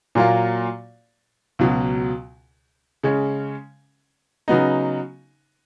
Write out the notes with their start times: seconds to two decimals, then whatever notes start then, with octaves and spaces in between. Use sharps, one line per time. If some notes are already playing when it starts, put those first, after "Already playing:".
0.15 A#2 F#3 A#3 F4
1.59 C#2 B2 F#3
3.03 C#3 G#3 C#4
4.48 C#3 F#3 B3 D#4